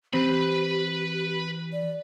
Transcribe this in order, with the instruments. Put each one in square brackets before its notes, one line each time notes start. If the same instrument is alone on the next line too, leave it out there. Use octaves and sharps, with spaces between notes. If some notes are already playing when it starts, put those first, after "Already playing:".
[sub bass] E3 [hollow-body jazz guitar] C4 [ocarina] G4 [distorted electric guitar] B4 B5
[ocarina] D5